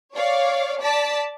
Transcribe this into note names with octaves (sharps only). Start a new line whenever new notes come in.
C#5 D5 F5
D5 A5 B6